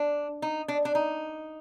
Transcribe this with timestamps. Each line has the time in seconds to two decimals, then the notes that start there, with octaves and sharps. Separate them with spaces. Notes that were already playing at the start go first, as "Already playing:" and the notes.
Already playing: D4
0.42 D#4
0.68 D4
0.85 D4
0.95 D#4